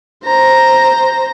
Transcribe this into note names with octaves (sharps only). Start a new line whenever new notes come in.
C5 A#5